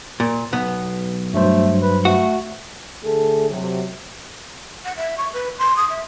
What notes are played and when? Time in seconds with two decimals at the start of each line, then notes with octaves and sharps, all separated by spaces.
0.20 A#2
0.53 B1 B3
1.34 G2 F#3 A3 C5
1.82 B4
2.05 A3 F#4
3.03 D3 A3 G#4 A4
3.49 C3 F#3
4.85 F#5
4.97 E5
5.18 C#6
5.34 B4
5.59 C6
5.77 D#6
5.90 E5